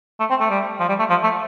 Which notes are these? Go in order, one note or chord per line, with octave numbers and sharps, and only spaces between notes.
A3
C4
A3
G3
F3
G3
A3
F3
A3